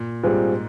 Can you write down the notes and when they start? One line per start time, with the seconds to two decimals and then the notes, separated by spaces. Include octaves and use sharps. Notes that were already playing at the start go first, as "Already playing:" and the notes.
Already playing: A#2
0.23 G#2 G3 C4 F4 G#4